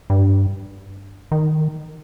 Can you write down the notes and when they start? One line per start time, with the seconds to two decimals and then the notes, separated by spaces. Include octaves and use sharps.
0.10 G2
1.32 D#3